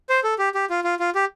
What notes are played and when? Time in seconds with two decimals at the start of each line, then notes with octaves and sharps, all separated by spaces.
0.09 C5
0.24 A4
0.39 G4
0.55 G4
0.70 F4
0.84 F4
0.99 F4
1.15 G4